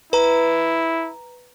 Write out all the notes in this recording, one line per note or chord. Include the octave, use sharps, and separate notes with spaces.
E4 B4 A#5